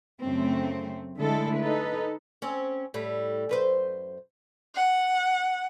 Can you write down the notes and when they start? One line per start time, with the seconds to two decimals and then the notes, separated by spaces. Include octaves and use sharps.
0.22 F#2 C#3 A3 C4
1.18 D3 G#3 A3 E4 A4
1.58 D#4 A4 B4
2.42 C4 C#4
2.94 A2 G3
3.49 F#2 B4 C5
4.75 F#5